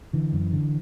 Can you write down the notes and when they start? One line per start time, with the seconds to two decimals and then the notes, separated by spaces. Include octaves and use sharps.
0.13 D3 E3
0.33 F#2
0.53 D3